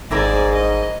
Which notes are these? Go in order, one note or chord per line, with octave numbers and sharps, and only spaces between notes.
G#1 G#2 C4 E4 G#4 A#4 D5
D#5